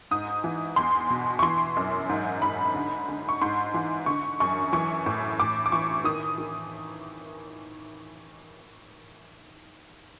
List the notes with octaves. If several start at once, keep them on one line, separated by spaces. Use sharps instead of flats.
G#2 D#6
E3
E2 C6
B2
C#6
E3 C6
F#2
G#2
G#2 B5
D3
D3
C#6
G#2 C6
E3
D3 C#6
F#2 C#6
E3 C#6
A2
A2 D6
D6
E3 C#6
D#3 D#6
D#3